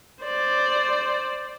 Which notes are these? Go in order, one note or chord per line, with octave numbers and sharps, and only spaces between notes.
C5 D5